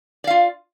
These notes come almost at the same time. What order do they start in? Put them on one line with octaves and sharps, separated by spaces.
D5 F5 F4